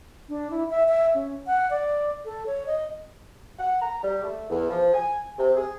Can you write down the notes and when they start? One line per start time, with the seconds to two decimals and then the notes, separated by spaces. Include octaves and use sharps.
0.29 D4
0.51 E4
0.70 E5
0.88 E5
1.14 C#4
1.47 F#5
1.70 D5
2.25 A4
2.46 C#5
2.67 D#5
3.58 F#5
3.82 A#5
4.03 G3
4.23 A3
4.50 E2
4.69 F3
4.94 G#5
5.37 C3
5.56 G#4